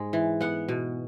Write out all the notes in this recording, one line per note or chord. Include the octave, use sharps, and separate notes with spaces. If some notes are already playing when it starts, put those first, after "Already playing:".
Already playing: G#2 G#3
E3
B3 F#5
B2